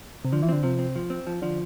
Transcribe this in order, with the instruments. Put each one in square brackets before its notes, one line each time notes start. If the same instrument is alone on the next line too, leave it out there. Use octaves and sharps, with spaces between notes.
[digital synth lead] C3
[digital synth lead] D3 [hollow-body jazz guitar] F3
[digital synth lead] E3
[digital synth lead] D3 [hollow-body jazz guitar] C4
[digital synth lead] C3 [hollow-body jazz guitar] F3
[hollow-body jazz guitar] C4
F3
C4
F3
[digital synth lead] D3 [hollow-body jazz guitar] F3